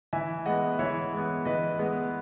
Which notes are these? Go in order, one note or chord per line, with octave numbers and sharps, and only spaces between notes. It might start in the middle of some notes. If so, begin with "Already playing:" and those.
E3 E5 G#5
G#3 B3 D#5 F#5
E3 C#5 E5
G#3 B3
E3 B4 D#5
G#3 B3